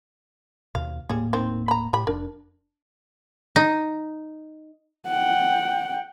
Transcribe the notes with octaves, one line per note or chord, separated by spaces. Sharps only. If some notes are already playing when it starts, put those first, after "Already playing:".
D#2 B2 F5
D#1 A2 G3 A#3 G#4
D#3 C4
A#5 B5
A2 G4 B5
F1 D4 A#4
D#4
F#5 G5